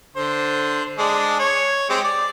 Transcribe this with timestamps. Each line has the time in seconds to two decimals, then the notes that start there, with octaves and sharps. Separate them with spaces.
0.16 D3 C5
0.98 G#3 D4
1.39 C#5
1.90 G#3 C4 G4
2.04 D5